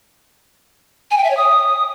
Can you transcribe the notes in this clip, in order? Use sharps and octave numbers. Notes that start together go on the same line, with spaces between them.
G#5
G5
E5
C#5
D#6